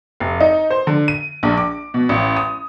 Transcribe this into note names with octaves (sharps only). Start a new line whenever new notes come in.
F1
D#4
C5
D3
D#7
A#1
D6
B2
A1
D#6